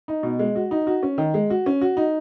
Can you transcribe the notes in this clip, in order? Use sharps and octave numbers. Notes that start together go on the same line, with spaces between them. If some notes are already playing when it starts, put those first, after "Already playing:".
D#4
B2
G#3
F#4
D#4
F#4
C#4
D#3
G#3
F#4
C#4
F#4
D#4